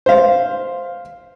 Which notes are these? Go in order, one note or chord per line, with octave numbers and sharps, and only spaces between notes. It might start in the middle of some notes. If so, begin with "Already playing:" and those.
C5 F5